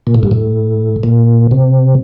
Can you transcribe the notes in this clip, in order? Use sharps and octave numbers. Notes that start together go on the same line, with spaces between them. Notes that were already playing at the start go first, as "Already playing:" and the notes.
A#2
A2
G2
A2
A#2
C3